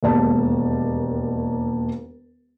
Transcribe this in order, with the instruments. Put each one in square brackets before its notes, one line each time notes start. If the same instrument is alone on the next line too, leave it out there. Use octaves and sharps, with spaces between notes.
[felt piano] E1 D#2 G#3 D5 A5